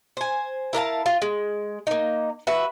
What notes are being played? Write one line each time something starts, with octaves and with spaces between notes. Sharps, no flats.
C5 G#5
E4 A#4 F5 A5
F4
G#3
A#3 D#4
F#4 B4 E5